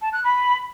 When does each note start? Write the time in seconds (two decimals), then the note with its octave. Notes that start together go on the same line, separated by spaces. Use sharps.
0.02 A5
0.13 F#6
0.24 B5